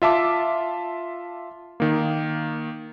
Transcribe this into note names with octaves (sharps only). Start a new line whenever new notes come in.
F4 E5 A5 D6
D#3 A#3